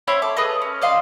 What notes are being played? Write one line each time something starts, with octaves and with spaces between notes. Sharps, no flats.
E4 C5 C#5 B5
A4 D6
G#4 A4 B4 D#5
C#4
D5 D#5 F5 C6